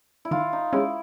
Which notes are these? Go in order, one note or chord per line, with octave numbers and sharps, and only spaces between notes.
E4
D#3 F4
D#4
G#3 C#4 E4